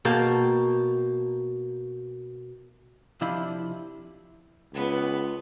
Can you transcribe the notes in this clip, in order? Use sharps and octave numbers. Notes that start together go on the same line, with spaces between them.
B2 A#3 G5 A5
C3 F3 D4 E4 D#5 B5
C#2 B3